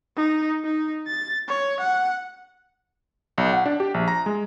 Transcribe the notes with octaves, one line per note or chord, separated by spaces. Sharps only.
D#4
D#4
A6
C#5
F#5
B1
F#5
D4
G4
A#1
A#5
G#3